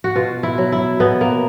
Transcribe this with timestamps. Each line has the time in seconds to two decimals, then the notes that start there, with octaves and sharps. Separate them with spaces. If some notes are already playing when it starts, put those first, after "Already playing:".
0.04 F#4
0.15 B2 F4
0.43 E4
0.58 F#3
0.72 E4
1.00 B2 B3
1.21 A#3